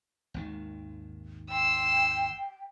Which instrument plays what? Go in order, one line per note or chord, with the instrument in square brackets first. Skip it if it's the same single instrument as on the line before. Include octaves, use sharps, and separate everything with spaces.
[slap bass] G#1 D#2 D#3
[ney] G5 [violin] C6 E6